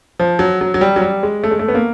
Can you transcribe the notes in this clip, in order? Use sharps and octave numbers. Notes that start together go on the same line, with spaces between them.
F3
F#3
F#3
F#3
G3
F#3
G3
G#3
A3
G#3
A3
B3
A#3